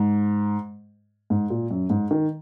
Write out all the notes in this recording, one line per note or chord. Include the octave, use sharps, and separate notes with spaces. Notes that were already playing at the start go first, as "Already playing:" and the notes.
Already playing: G#2
G#2
A#2
F#2
G#2
D#3